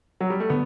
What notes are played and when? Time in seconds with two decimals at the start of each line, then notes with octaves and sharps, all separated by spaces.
0.20 F#3
0.30 G3
0.40 A3
0.50 D3 B3